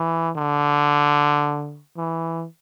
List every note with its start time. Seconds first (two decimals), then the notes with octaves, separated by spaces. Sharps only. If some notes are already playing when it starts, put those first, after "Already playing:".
Already playing: E3
0.36 D3
1.97 E3